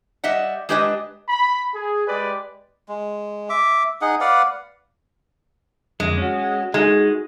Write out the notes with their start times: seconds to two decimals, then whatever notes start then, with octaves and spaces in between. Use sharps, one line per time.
0.24 G3 D#5 E5 F#5
0.69 G#3 D4 G4 B4 D5 D#5
1.29 B5
1.74 G#4
2.08 G#3 G4 B4 D5
2.88 G#3
3.50 E5 D6
4.01 D#4 G#4 F#5
4.21 B4 D5 F5 F#5
6.00 F2 D3 G#3
6.17 C#4 F#4
6.74 G#3 D#4 F#4 G#4